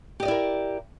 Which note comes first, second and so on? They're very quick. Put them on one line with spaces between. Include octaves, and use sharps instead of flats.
G4 D#5 D5 E4 A#4